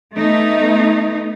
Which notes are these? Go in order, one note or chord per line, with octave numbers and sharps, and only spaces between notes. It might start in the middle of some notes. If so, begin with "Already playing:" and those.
A3 B3 D#4